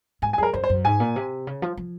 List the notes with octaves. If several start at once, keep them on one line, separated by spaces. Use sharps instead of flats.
G#2 G#5
G#5
F#2 G#4 A#4
F#2 C5
C5
F#2
G#2 G#5
A#2
C3
C#3
F3
F3